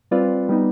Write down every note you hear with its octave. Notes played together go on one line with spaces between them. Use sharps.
G3 C4 F4 B4 D5
G3 B3 D#4